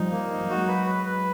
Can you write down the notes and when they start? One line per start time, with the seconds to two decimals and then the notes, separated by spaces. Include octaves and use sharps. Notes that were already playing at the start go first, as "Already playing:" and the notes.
Already playing: F3 G3 D#4
0.11 A#3
0.31 D#4
0.49 F#3 G#3 F#4
0.67 B4
0.86 B4
1.05 B4